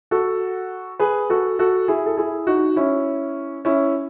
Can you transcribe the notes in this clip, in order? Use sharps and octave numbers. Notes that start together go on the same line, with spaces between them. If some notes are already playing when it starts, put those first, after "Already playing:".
F#4 A4
G#4 B4
F#4 A4
F#4 A4
E4 G#4
A4
E4 G#4
D#4 F#4
C#4 E4
C#4 E4